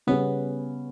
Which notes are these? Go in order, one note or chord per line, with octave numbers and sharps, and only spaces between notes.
C#3 G3 B3 C#4 B4